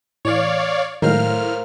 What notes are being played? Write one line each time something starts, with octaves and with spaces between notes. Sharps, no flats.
A2 E3 C#5 D5 F5
A2 D#3 F#3 G#3 A#4 C5 F5 F6